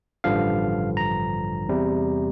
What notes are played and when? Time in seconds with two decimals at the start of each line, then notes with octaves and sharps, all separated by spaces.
0.24 A1 G2 D3 F3 F5
0.97 A#5
1.68 E2 C3 G3